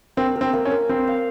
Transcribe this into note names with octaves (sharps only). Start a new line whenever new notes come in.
A#3 C4
A#4
C4
A#3
C#4
A#4
C4 C5
F5